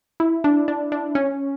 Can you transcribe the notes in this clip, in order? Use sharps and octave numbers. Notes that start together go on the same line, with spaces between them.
E4
D4
D4
D4
C#4